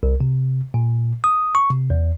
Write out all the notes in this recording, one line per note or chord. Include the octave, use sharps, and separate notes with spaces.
C2
C3
A#2
D#6
C#6
C3
E2